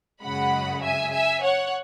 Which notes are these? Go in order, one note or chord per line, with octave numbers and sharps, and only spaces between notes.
F#2 C#3 G#3 F#5 B5
E5 G#5
E5 G#5
C#5 F#5